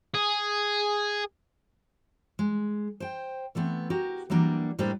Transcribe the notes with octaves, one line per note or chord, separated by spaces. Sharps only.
G#4
G#3
C5 G5
E3 A3 B3 C4
F#4 G4 A#4
E3 F#3 G3 A#3 D4
A2 G3 A#3 D4 B4 C5